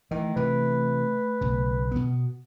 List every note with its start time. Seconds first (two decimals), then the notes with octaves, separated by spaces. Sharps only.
0.11 D#3 E3 A3
0.36 C3 E3 B4
1.41 B1 C#3
1.91 B2 B3